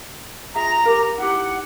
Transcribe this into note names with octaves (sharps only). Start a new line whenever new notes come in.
F4 G#4 E5 A#5
G4 A#4 F5
D#4 E4 G4 F#5